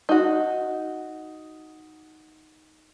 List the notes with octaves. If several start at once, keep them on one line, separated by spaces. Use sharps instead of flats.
D#4 F#4